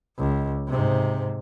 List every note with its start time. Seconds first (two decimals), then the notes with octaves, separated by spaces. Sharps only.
0.18 C#2
0.68 G#2 C3